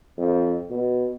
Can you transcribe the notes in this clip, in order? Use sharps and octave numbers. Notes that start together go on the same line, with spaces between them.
F2
B2